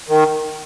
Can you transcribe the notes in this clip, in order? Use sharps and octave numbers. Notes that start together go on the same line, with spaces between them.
D#3